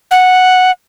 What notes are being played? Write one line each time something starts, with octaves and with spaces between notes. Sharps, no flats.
F#5